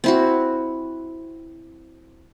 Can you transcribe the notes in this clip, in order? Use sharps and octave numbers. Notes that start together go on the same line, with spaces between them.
C4 E4 F#4